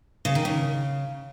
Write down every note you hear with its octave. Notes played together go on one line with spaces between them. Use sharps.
C#3
D#3
C#3